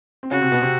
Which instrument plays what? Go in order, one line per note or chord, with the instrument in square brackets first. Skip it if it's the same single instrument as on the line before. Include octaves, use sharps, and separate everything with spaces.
[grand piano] C4
[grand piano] C#3 C#4 [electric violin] F#4
[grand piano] C3 C4
B2 B3
C3 C4